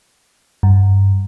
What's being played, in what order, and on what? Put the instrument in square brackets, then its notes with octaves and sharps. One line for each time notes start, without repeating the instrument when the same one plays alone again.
[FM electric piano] G2